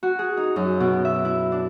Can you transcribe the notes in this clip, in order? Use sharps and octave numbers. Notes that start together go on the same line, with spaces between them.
F#4
G#4
D#4
F#2
B2
E5
E4
D4